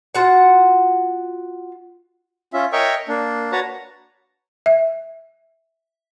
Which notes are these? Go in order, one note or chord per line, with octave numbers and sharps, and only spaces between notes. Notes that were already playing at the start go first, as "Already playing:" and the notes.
F4 F#4 F#5
C#4 F4 E5
A#4 C#5 D#5 E5 G5 C#6
A#3 D4
F#4 B4 C#5 A5 A#5
E5